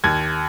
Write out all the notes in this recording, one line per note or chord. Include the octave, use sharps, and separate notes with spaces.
D#2 G#6